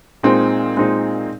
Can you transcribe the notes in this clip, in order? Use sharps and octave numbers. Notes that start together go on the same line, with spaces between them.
A#2 G#3 C4 D#4
A#2 G#3 C4 D#4